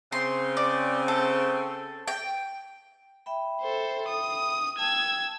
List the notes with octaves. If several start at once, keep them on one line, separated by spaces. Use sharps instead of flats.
C#3 C4 C6
D5
A4
G5
E5 G5 B5
A4 C5
D#6
G5 A5 E6 G#6